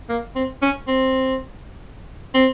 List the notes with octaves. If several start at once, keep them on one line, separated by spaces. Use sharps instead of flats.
A#3
C4
C#4
C4
C4